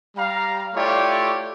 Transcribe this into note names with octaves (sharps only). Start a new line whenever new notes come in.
G3 F5 A#5
A3 E4 F4 G4 C#5 D5